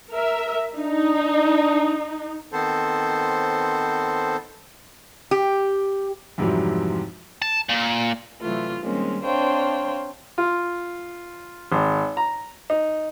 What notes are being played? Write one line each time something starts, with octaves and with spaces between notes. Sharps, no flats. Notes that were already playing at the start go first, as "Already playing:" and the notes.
A#4 E5
D4 D#4
D#3 B3 C4 A4 C5
G4
F2 G#2 C3 E3 F#3 G3
A5
A#2
C3 E3 F#3 A3 F4
D#3 G3 G#3 A#3 C4 C#4
C4 D4 C5 C#5 F5 G5
F4
G#1
A#5
D#4